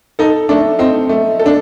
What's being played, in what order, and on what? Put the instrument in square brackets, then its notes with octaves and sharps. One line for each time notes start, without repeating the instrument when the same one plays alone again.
[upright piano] D#4 [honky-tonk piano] A4
[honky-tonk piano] A3 [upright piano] D4
[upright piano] C4 [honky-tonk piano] D#4
[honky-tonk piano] A3
A4
[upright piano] D4